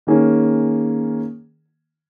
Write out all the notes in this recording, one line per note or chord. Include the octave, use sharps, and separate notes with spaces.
D#3 A#3 C#4 G#4